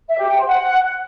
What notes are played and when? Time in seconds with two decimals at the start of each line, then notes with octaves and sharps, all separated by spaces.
0.09 E5
0.18 G4
0.28 G5
0.37 C5
0.47 F#5